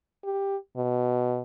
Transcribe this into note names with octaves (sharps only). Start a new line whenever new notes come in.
G4
B2